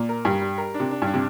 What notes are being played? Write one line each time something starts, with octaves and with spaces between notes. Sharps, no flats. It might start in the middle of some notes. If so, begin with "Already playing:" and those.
Already playing: A#2
A#4
G2 G3
G3
A#4
D4
C3
D4
G2 D4
C3